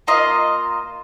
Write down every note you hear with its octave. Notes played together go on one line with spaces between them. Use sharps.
A#3 F4 D#5 C6